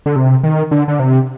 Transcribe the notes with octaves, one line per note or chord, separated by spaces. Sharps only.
D3
C3
D#3
D3
D3
C3